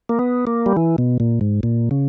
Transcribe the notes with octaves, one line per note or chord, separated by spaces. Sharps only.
A#3
B3
A#3
G3
E3
B2
A#2
G#2
A#2
C#3